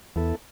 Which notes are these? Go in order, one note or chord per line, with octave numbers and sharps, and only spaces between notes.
E2 B3 E4 A4